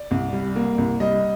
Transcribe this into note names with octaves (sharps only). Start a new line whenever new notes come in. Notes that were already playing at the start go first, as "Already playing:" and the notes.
Already playing: D5
C2
G3
A#3
C2
G3 D#5